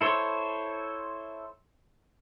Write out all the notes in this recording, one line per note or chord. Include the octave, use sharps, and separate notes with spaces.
E4 A4 C5 C#5